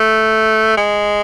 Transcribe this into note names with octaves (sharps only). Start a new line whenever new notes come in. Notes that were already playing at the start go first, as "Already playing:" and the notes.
Already playing: A3
G#3